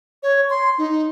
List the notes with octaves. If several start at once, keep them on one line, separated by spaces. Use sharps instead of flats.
C#5
C6
D#4